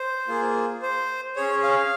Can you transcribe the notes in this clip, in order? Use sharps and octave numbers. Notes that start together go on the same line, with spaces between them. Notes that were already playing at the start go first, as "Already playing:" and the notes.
Already playing: C5
A#3 F4 G#4
C5
C#4 G#4 C#5
F5